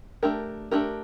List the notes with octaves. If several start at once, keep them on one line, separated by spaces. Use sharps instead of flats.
A3 D4 G4 A#4
A3 D4 G4 A#4